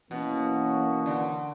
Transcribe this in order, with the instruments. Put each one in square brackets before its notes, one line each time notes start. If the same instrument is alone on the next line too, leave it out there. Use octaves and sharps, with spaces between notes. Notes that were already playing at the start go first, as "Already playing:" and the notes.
[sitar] B2 [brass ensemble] E3 A#3 C#4 F#4
[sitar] D3